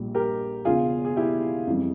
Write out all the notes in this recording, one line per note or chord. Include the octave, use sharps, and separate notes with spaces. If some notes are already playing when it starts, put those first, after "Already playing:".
Already playing: A#1 A#2 G3
G4 A#4
E1 E2 C#3 F4 G#4
G#4
E4 G4
F2 E3 G3